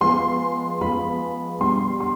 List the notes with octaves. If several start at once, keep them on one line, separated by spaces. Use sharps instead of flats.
F3 G#3 B3 C6
F3 G#3 B3 B5
B2 G3 D4 C6
C6